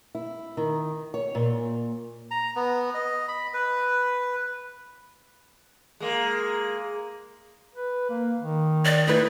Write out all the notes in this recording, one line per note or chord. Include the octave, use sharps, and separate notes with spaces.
E4
D#3
C#5
A#2
A#5
B3
D#5
B5
B4
G#3 A#3
B4
A#3
D#3
D5
A3 D#4 E4 B4